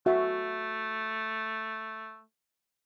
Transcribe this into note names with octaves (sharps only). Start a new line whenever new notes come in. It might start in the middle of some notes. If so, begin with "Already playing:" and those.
A3 F#4 E5